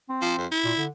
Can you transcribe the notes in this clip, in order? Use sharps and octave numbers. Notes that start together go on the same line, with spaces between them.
C4
F3
F2
E4
A#2
D3